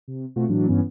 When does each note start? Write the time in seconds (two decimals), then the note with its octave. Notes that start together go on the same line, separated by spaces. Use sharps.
0.08 C3
0.36 B2 A3 C4 F4 F#4
0.49 A2 E3 F#3 D4
0.67 G2 E3 B3 C#4